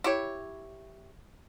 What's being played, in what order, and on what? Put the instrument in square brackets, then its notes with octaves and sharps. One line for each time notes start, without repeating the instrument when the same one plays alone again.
[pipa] E4 G4 C#5